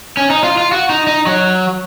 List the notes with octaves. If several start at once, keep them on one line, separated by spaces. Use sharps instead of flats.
C#4
D#4
F4
F4
F#4
D#4
D#4
F#3